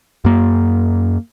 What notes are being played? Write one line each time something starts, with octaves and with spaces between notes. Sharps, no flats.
F#2 A#3